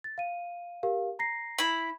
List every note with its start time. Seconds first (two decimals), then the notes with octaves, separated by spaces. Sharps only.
0.04 A6
0.18 F5 D#7
0.83 G4 A#4 F5
1.19 A#5 A#6 C7
1.58 E4 B5